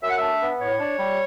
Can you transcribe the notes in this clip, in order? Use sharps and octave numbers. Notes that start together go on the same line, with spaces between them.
F#2 E5
F#5
D4 E5
B3
A2 C#5
D4
G3